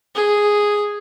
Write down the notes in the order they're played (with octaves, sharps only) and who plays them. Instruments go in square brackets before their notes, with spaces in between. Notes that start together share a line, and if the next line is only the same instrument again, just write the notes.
[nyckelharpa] G#4